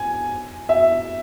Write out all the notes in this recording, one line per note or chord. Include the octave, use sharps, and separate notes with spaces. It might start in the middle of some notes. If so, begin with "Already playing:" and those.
Already playing: G#5
E5